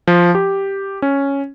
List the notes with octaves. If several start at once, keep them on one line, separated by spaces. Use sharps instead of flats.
F3
G4
C#4